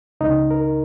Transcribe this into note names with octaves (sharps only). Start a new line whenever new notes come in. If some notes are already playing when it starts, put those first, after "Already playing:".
C#2 C#3 D#4
A#4